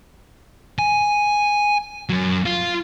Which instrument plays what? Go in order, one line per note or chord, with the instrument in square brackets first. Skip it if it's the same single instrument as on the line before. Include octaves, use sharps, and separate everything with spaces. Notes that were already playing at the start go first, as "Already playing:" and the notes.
[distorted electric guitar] G#5
F#2 F#3
F4